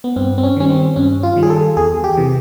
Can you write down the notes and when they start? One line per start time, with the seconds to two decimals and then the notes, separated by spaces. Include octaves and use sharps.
0.04 B3
0.16 G2 C4
0.38 C4
0.43 C#4
0.56 D#3 G3 C#4
0.70 C4
0.96 G2 C#4
1.23 F4
1.36 D#3 G3
1.43 G#4
1.50 A4
1.77 E2 G#4
2.04 G4
2.17 C3 E3